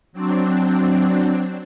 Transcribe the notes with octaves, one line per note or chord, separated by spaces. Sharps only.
F#3 C4 D4